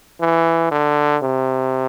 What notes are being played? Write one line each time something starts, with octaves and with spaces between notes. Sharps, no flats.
E3
D3
C3